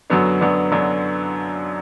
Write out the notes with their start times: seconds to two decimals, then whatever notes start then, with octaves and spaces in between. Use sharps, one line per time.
0.10 F#2 D3 F#3 B3 D4
0.41 F#2 D3 F#3 B3 D4
0.72 F#2 D3 F#3 B3 D4